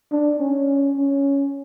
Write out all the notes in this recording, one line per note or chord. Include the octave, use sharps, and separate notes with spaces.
D4
C#4
C#4